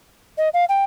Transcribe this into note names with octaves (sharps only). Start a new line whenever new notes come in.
D#5
F5
G5